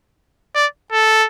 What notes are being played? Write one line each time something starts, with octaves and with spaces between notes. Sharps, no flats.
D5
A4